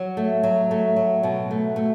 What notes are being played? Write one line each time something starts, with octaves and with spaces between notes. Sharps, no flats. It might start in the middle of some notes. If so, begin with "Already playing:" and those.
Already playing: F#3
A3
F#3
A3
F#3
B2
A3
A3